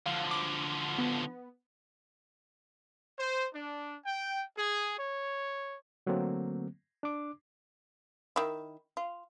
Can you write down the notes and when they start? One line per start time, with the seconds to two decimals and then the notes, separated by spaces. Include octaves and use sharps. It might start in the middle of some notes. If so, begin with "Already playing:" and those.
0.06 D3 F3 F5
0.31 D6
0.98 B3
3.19 C5
3.54 D4
4.05 G5
4.58 G#4
4.98 C#5
6.06 D3 F#3 A3 A#3 C4
7.03 D4 D6
8.36 D#3 E4
8.97 F4